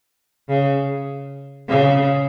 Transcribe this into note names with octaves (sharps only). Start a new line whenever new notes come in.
C#3
C#3